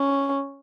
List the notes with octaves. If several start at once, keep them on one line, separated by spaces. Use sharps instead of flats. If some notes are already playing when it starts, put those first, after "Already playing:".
Already playing: C#4